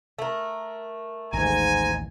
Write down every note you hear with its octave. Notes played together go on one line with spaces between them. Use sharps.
A3 A#4
A1 D#2 G#2 G#5 A#5